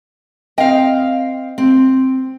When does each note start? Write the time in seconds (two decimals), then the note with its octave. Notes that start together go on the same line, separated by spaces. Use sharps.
0.58 C4 D#5 F5 G5
1.58 C4